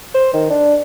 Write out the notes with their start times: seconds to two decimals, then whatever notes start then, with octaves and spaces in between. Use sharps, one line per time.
0.14 C5
0.34 D#3
0.50 D4